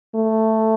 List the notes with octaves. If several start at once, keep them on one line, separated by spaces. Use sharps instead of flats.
A3